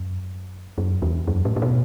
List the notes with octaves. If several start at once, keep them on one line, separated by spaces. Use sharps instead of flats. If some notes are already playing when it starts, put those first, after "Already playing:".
Already playing: F#2
F#2
E2
F#2
A2
A2
B2